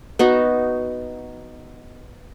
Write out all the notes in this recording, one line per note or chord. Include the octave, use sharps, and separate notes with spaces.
B3 D#4 F#4